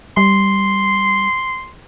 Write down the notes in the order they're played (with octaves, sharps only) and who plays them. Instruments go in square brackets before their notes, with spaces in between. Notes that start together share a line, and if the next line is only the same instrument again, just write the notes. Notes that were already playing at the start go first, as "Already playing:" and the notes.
[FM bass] G3 [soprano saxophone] C6